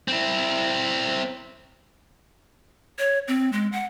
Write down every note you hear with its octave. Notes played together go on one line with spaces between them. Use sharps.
C4 E4
C#5
C4
G#3
F#5